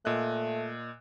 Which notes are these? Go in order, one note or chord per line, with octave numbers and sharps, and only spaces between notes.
A#2 A3 D#5 F#6